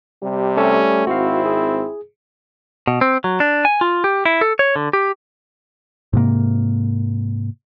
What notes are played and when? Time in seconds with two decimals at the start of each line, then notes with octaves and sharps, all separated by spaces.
0.23 C3 G3
0.57 A3 C#4 A4
1.07 G#1 C4 E4 F#4 F5
1.45 G#4
2.87 B2
3.01 C4
3.24 F#3
3.40 D4
3.65 G#5
3.81 F4
4.04 G4
4.26 E4
4.41 A4
4.59 C#5
4.76 D3
4.93 G4
6.13 G#2 C3 A#3